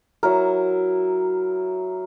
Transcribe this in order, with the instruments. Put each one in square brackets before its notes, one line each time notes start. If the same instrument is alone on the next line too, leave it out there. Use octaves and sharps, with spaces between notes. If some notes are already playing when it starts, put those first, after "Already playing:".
[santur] F#3 E4 A#4